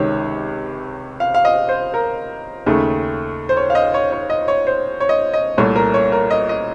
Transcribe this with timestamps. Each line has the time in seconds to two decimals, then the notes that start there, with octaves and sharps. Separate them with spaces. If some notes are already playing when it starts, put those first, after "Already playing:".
Already playing: C#2 C3 D#3 C#5
1.20 F5
1.34 F5
1.45 D#5
1.69 C5
1.94 A#4
2.66 D#2 C#3 A3
3.49 C5
3.57 C#5
3.70 F5
3.75 D#5
3.94 C#5
4.12 C#5
4.30 D#5
4.48 C#5
4.67 C5
5.00 C#5
5.09 D#5
5.34 D#5
5.58 C2 A#2 A3 C#5
5.76 A#4
5.94 C#5
6.12 A#4
6.31 D#5
6.49 D#5